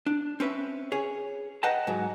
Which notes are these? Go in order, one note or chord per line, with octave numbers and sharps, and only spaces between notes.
D4
C4 C#4 B4 E5
G#4 C#5
B4 D#5 F#5 G5 A5 A#5
G#2 F#3